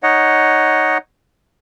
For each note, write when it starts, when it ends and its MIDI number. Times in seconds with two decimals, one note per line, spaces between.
0.03 0.98 63
0.03 0.98 73
0.03 0.98 75
0.03 0.98 78